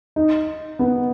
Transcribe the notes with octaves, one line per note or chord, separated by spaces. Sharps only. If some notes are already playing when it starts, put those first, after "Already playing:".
D#4
B3